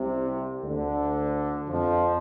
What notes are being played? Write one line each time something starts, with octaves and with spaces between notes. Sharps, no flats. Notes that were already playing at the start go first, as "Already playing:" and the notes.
Already playing: C2 C3
D2 D3
F2 F3